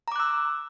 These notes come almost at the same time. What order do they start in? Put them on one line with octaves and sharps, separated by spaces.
A#5 D6 F#6 E6